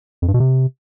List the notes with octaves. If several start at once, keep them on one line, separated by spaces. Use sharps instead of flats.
F2
G2
B2
C3